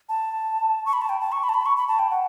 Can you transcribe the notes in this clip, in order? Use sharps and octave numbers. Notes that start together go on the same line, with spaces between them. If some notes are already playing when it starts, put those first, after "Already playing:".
A5
C#6
B5
A5
G5
A5
C#6
B5
A5
B5
C#6
B5
A5
G5
F#5